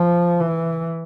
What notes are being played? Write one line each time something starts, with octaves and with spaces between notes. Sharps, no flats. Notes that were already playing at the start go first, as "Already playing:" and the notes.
Already playing: F3
E3